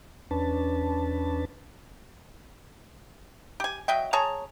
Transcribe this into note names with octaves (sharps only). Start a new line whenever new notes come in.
E2 C#4 D4 B4 A5
G4 G#5
F#3 D#5 E5 G5
G#4 C#5 A5 A#5